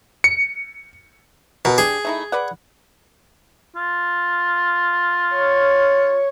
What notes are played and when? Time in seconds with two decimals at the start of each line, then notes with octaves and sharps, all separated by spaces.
0.24 C#7
1.65 B2 A#4
1.78 D4 G4 G#4
2.05 A3 D#4 E4
2.32 B4 D5 F#5
3.76 F4
5.34 C#5